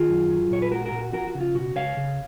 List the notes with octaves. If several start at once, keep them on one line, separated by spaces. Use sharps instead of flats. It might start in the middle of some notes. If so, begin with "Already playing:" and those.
Already playing: D#3 F4 G#4
F#2
F#3
A#2 C#5
B4
G#3 F#4 A#4
F#4 A#4
A#2
F#4
F3 F#4 A#4
F#4
C#3
F4
B2 F#4
C#2 C#5 F5
C#3